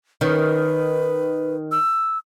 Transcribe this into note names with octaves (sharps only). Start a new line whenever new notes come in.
D#3 C#4 B4
E6